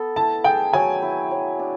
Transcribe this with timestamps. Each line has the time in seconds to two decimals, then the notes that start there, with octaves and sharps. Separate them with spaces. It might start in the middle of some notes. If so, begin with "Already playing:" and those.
Already playing: B3 A4
0.16 E4 A5
0.44 G#4 G5
0.73 F#3 G#5
1.02 E4
1.31 F#3
1.59 D4